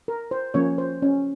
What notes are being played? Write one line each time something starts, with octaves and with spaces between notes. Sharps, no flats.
A#4
C5
F3 A#3 C#4 C#5
C5
C#4